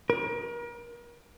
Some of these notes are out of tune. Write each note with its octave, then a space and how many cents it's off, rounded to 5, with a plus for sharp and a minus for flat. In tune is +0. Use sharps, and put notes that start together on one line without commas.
A#4 +35